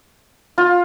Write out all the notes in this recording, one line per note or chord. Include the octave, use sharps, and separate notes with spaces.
F4